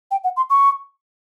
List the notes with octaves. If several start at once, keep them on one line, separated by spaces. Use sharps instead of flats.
G5
F#5
C6
C#6